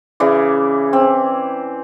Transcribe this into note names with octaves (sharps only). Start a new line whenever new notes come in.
C#3 E3 D5
C4